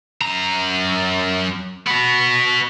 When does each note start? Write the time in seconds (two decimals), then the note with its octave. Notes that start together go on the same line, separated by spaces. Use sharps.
0.21 F#2 A#5
1.87 B3 F#4